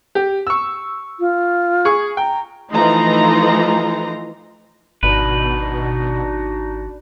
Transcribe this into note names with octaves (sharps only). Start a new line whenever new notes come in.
G4
C#6 E6
F4
G#4 C#6
G5 A#5
E3 F3 A3 D#4 A#5 C6
G#1 B2 D4 D#4 F#4 B4